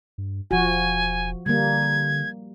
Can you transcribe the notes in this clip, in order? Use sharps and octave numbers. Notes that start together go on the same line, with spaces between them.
G2
E1 F3 F#4 G#5
D3 G3 A#3 G#6